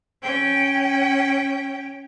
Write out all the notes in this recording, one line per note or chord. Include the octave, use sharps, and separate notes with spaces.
C#4 G5